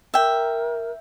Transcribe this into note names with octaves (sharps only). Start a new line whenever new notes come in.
A#4 E5 G5